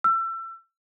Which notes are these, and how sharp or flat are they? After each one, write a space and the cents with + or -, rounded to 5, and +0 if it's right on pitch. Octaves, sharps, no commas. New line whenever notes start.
E6 +30